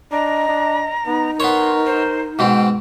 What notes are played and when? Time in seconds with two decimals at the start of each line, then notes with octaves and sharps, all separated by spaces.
0.12 D4 D#5 A#5
0.49 D4
1.06 B3 D#4
1.40 B3 A#4 C#5 C6
1.86 C5
2.39 G#2 B2 C4 G5